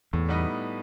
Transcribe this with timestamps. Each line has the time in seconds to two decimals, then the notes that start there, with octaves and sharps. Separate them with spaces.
0.13 E2 A2
0.29 G3 B3 D#4